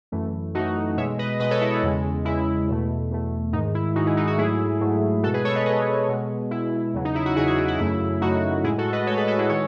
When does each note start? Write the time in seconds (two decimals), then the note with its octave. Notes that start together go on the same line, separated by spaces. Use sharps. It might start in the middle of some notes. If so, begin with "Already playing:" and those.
0.12 F#2 E3 A3
0.55 F#2 E3 A3 D#4 F#4
0.97 B2 G#3 C#5 E5
1.19 B4 D#5
1.40 B2 G#3 B4 D#5
1.51 A4 C#5
1.61 E4
1.72 E4
1.83 E2 C#3 G#3
2.25 E2 C#3 G#3 E4
2.68 E2 B2 A3
3.11 E2 B2 A3
3.53 G#2 D#3 G#3 D#4
3.75 E4
3.95 G#2 D#3 G#3 D#4 F#4
4.06 E4 G#4
4.17 D#4 F#4
4.27 D#4 F#4
4.38 G#2 F#3 A3 E4 G#4
4.81 G#2 F#3 A3
5.23 B2 G#3 F#4 A4
5.34 G#4 B4
5.45 A4 C#5
5.55 B4 D#5
5.66 B2 G#3 B4 D#5
6.08 B2 G#3
6.51 B2 G#3 E4
6.94 E2 C#3 F#3
7.05 D#4
7.15 E4
7.26 F#4
7.36 E2 C#3 F#3 E4 G#4
7.47 D#4 F#4
7.58 E4
7.68 E4
7.79 F#2 C#3 F#3 A3 E4
8.21 F#2 C#3 F#3 A3 D#4 F#4
8.64 A2 G#3 E4 G#4
8.78 F#4 A4
8.92 B4 D#5
9.06 A2 A4 C#5
9.11 G#3
9.17 G#4 B4
9.28 F#4 A4
9.39 E4 G#4
9.49 D#3 G#3 A4 C#5